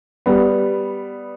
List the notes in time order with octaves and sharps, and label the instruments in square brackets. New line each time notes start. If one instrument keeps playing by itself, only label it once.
[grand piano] G3 B3